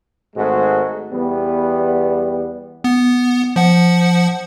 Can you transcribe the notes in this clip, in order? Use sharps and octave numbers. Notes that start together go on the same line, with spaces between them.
G#1 G#2 G#3 A3 F#4
E2 G3 B3
B3
F3 F#5